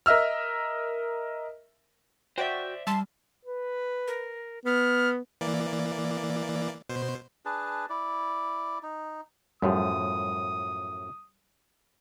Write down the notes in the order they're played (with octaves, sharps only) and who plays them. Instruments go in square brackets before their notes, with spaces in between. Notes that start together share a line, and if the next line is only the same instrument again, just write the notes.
[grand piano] A#4 D#5 E5 E6 F6
[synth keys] F#4 G5 [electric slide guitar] C5 D5 E5
[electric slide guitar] G3 [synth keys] E5 C6 [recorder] A5
[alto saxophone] B4
[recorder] A#4
[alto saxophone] B3 [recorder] F6
[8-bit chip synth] E3 A#3 D5
B2 C5
[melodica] D4 G#4 B4 A5
E4 D5
D#4
[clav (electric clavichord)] F#2 A2 F3 [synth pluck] G3 [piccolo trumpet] D#6